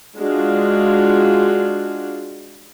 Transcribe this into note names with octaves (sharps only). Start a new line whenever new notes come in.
G#3 D4 F4 F#4